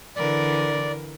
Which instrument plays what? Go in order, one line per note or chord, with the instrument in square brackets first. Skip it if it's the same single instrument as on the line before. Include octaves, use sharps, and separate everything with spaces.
[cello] D3 E3 [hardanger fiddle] A#4 [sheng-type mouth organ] D5